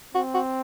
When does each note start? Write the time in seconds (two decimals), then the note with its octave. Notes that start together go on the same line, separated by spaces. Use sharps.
0.15 C4 F#4
0.34 F#4